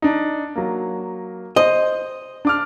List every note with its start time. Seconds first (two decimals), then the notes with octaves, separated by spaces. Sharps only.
0.02 D4 D#4
0.56 F#3 A#3
1.56 C5 D#5
2.45 D4 D6 F6